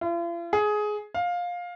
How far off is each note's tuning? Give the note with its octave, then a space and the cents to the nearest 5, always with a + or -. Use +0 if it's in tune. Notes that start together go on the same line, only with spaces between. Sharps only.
F4 -45
G#4 +15
F5 +15